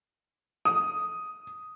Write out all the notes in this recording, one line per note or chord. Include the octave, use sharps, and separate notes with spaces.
D#6